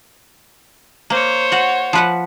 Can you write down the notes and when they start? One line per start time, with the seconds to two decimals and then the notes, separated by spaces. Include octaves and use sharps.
1.10 A#3 C5 C#5
1.52 F#4 F#5
1.93 F3 B4 F#5